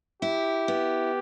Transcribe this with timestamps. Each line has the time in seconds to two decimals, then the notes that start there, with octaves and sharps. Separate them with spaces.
0.22 E4 G4
0.68 B3